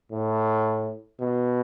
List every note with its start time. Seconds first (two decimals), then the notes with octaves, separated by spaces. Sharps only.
0.12 A2
1.20 B2